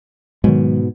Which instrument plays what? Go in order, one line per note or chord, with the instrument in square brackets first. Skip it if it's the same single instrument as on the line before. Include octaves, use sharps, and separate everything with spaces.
[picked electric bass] G#2 B2 [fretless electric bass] D#3 F#3 G#3